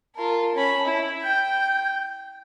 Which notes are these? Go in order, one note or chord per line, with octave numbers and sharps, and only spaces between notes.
F4 A#4 A5
C#4 B5
E4
G5 G6